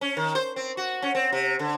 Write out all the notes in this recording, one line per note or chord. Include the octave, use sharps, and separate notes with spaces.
C#4
D#3
C5
C4
F#4
C#4
C4
C3
D3